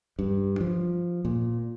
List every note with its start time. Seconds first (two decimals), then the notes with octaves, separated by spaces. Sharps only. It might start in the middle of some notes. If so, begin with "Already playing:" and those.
0.19 G2
0.60 F3
1.25 A#2